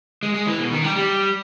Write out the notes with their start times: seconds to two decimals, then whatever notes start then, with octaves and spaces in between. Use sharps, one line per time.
0.23 G#3
0.34 G#3
0.47 E3
0.59 B2
0.72 D#3
0.84 G3
0.96 G3